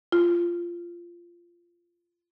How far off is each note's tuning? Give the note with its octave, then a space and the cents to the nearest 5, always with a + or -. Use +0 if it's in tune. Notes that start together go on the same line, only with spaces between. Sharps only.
F4 -15